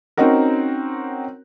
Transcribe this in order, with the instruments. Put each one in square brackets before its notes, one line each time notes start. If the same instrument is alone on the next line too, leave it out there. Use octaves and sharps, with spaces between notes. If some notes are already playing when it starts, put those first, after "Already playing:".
[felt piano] C4 C#4 D#4 F#4 A#4